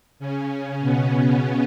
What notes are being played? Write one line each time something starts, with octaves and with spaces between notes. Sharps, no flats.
C#3 C#4
B2 B3